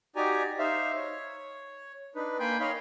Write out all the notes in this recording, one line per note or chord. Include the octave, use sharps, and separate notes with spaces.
D#4 F#4 G4 D5 G#5 A#5
D#4 C5 E5 F5
C#5
D4 D#4 B4
A#3 G5 G#5 B5 C6 G6
D#4 C#5 D#5 F5 B5 C6